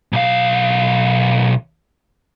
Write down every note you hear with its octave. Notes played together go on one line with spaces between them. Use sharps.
B1 F5